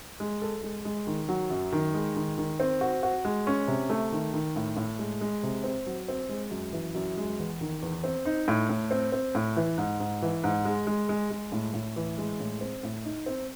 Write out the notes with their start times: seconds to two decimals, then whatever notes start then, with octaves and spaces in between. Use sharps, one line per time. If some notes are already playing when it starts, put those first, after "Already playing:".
0.20 G#3
0.42 A4
0.63 G#3
0.85 G#3
1.07 D#3
1.28 F#3
1.50 F#2
1.72 D#3
1.94 G#3
2.16 D#3
2.38 D#3
2.60 C4
2.81 F#4
3.03 F#4
3.25 G#3
3.47 C#4
3.68 C3
3.90 A3
4.12 D#3
4.33 D#3
4.56 A2
4.76 A2
4.99 G#3
5.21 G#3
5.43 C3
5.64 C4
5.86 F#3
6.08 C4
6.29 G#3
6.51 F#2
6.73 E3
6.95 F#2
7.17 G#3
7.39 E2
7.61 D#3
7.82 E2
8.04 C4
8.25 D#4
8.48 A2
8.69 A2
8.91 C4
9.12 C4
9.35 A2
9.56 E3
9.78 G#2
10.00 G#2
10.22 E3
10.44 G#2
10.65 G#3
10.87 G#3
11.09 G#3
11.30 G#3
11.52 A2
11.74 A2
11.96 E3
12.18 G#3
12.40 A2
12.61 C4
12.83 A2
13.05 D#4
13.26 C4